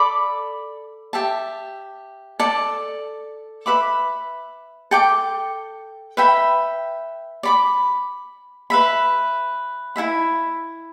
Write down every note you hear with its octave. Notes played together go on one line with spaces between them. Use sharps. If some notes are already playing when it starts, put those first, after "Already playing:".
Already playing: A4 D5 B5 D6
G4 E5 A5
A4 D5 A5
B4 E5 B5 D6
A4 G5 D6
B4 E5 G5 B5
D5 B5 D6
B4 E5 B5
E4 A4 E5 B5